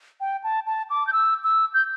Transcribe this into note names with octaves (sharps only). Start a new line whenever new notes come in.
G5
A5
A5
D6
G6
E6
E6
G6